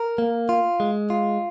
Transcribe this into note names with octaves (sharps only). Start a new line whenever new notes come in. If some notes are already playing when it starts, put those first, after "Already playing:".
Already playing: A#4
A#3
F4
G#3
F4